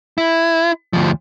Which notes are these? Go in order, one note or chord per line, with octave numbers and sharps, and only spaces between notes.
E4
D2 F3